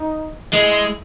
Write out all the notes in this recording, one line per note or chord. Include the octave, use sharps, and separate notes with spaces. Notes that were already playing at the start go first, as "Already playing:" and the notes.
Already playing: D#4
G#3 E4